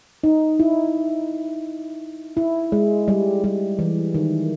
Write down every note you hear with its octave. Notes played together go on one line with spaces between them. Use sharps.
D#4
E4
E4
G#3
G3
G3
E3
D#3